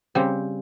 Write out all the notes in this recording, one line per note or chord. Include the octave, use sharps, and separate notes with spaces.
C#3 G3 C4